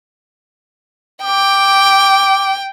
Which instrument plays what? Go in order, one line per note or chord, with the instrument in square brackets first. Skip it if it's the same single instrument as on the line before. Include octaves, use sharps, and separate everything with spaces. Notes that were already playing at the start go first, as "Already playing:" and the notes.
[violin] G5 [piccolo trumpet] D6